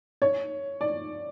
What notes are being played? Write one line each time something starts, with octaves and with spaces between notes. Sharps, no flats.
C#5
D5